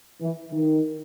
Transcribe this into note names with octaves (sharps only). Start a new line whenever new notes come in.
E3
D#3